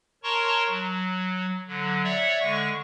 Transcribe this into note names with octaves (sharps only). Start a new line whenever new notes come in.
A#4 C#5 A5 A#5 C6 C#6
F#3
D3 F#3
C#5 D5 E5 F#5
D3 G#3 C#6